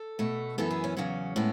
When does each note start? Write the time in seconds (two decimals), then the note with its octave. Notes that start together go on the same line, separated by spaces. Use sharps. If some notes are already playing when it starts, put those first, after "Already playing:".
Already playing: A4
0.19 B2 A3
0.58 F#2 E3 B3 A4
0.71 G#4
0.84 C#4
0.97 E2 C#3 F#3 C#4
1.36 A2 G#3 B3